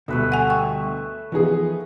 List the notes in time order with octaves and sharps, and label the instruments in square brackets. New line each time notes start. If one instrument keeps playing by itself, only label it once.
[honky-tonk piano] D2 B2 [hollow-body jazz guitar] D3 G3 [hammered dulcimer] A3 B4 E5
[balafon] F#5 G#5
[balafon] G5 [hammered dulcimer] C#6
[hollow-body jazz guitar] E3 F3 [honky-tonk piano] B3 D#4 G#4